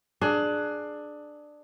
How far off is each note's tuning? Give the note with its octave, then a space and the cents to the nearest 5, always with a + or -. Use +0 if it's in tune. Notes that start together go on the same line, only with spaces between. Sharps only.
D4 +15 G#4 +20